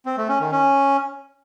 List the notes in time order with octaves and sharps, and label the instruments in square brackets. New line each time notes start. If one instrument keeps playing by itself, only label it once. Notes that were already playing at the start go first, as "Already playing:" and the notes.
[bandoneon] C4
A3
C#4
D#3
C#4